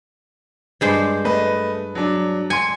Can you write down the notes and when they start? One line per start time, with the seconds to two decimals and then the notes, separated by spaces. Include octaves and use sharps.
0.81 G2 G#3 C5
1.25 A3 B4 D#5
1.95 F#3 D4
2.50 G#5 C6 C#7